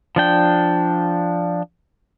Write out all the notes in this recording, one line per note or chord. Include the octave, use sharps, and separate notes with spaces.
F3 D4 G5